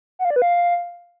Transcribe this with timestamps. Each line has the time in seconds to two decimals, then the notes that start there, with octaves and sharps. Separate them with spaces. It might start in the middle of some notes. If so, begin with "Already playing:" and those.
0.19 F#5
0.25 F5
0.30 D5
0.36 B4
0.42 F5